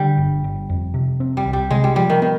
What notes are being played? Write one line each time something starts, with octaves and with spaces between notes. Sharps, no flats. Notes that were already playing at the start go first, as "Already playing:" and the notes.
Already playing: D3 G3
G1
G1
F2
C3
C4
G3
C2
G3
C3 G#3
G3
F3 G3
D#3
D#3 B3